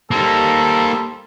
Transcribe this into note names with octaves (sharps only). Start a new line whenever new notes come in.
G3 A#3 D#4 A4 C5